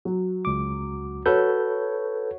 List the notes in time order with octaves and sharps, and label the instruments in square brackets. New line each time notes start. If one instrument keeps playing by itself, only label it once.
[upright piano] F#3
[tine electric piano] C#2 D6
[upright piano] F#4 C#5 [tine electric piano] A4 B4 G6